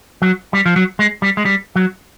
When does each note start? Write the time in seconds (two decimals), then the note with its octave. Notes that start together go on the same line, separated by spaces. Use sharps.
0.22 F#3
0.53 G3
0.66 F3
0.76 F#3
0.99 G#3
1.22 G3
1.37 G#3
1.45 G3
1.76 F#3